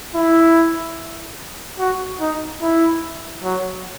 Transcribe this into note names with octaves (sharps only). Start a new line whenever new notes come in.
E4
F#4
D#4
E4
F#3